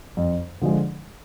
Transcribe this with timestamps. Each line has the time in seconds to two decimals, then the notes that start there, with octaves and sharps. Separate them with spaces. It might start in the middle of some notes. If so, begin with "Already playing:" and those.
0.17 F2
0.61 D3 F3 G#3